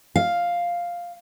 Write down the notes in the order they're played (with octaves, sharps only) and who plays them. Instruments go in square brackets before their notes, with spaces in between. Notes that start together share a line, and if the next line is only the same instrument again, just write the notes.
[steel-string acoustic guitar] F5